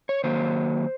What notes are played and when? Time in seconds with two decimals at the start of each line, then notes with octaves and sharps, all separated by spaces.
0.09 C#5
0.24 D#3 F#3 A#3 C5